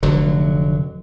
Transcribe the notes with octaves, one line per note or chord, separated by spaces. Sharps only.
F1 D3 F#3